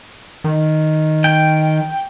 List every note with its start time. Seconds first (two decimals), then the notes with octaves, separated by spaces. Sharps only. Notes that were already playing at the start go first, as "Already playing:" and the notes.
0.44 D#3
1.24 G5